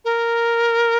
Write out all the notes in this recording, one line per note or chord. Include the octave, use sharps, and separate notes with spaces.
A#4